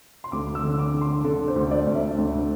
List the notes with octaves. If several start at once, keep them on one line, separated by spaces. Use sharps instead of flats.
C6
D2 D6
E6
D3
D6
D3
C6
D3 A4
C5
D2
D5
D2
E5
D2